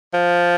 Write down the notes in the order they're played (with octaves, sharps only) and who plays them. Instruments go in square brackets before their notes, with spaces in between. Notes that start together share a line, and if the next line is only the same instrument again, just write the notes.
[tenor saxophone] F3